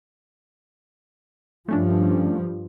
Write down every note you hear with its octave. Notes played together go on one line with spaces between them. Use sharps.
G2 F3 A3 C#4 D4